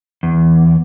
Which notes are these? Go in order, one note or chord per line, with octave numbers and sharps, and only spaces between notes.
E2